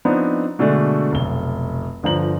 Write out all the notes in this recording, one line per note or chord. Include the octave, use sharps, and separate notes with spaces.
F3 B3 C4 D4 D#4
B2 D3 G#3 A3 D4
F1 B1 G7
G1 D3 F3 A#5 F#7